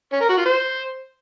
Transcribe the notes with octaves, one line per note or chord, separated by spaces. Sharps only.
C#4
A#4
F#4
F4
C5